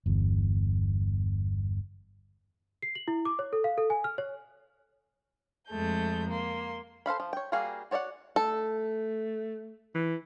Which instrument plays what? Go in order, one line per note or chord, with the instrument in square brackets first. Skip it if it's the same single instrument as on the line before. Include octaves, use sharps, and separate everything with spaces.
[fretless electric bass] G1 E2
[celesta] C7
F#7
E4
D6
C#5
A4
F5
A4
G#5
F6
C#5
[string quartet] F2 G#3 A3 G6
A#3 C6
[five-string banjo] A4 C5 F5 B5
F3
C#5 G5
G3 A#3 F#4 G#4 F5
F#4 C#5 D5 E5 F#5
[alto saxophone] A3 [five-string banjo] A4
[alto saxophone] E3